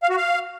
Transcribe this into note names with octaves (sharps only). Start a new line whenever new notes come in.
F5
F#4
F5